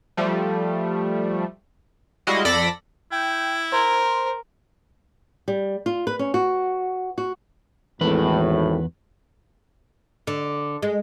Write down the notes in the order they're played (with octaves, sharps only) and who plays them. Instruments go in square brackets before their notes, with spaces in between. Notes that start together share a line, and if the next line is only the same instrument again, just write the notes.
[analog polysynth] F3 G3 A3
G3 G#3 E4 F#4 D#5 F5
F2 A4 D5 B5 A#6
[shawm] E4 [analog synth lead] G5
[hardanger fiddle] A#4 [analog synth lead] C5
[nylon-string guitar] G3
F4
B4
C#4
F#4
F#4
[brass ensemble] G#1 A2 [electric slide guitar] E2 B4
[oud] D3
G#3